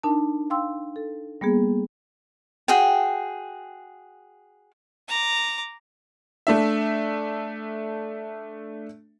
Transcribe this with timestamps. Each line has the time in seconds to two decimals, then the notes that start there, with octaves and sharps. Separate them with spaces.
0.03 D4 D#4 A#4 A5
0.50 F5 G5 C6 E6
0.96 A4
1.41 G3 A#3 B3 G#4
2.68 F#4 G#4 G5
5.08 A#5 D6
6.47 A3 D4 E5